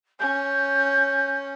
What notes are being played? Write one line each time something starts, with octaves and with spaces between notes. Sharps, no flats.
C#4 G6